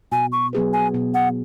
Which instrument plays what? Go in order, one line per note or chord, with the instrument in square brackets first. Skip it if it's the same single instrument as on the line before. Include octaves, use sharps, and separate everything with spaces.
[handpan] B2 [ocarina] G#5
[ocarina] C#6
[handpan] F#3 B3 G#4 B4
[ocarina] G#5
[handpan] B2
[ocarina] F#5